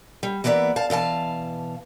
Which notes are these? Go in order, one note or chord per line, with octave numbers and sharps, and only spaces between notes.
G3
E3 A#3 B3 D5 E5
F5 A5
B2 E3 F5 A5